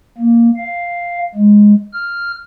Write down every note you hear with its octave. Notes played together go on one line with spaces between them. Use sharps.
A#3
F5
G#3
F6